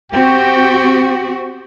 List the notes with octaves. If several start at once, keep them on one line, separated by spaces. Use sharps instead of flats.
C4 F#4 G4 G5